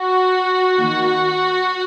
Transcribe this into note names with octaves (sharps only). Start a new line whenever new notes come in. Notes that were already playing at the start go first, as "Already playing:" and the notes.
Already playing: F#4
D#3 A#3